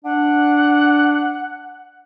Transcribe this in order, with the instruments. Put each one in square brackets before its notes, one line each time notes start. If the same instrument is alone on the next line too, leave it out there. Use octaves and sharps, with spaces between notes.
[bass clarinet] D4 [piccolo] F#5